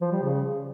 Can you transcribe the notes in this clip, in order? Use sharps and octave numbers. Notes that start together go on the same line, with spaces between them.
F3
G3
C#3